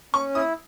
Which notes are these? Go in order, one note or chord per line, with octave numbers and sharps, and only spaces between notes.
C#4 C#6
E4 D#6